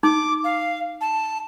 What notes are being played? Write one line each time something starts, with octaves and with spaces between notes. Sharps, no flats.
D#4 D6
F5
A5